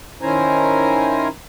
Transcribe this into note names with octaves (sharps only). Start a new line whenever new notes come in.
D#3 C#4 E4 C5 G#5 A#5